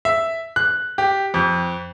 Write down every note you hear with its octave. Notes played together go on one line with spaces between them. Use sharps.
E5
F#6
G4
F2